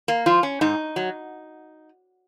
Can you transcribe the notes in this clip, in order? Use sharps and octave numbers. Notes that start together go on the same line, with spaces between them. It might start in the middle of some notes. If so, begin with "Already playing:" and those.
A#3
F3 F4
C#4
G#2 D#4
F#3